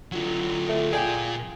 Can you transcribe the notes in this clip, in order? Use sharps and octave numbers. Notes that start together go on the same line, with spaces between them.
D3 F#3 F4
A3
A#2 G#4 D5 G5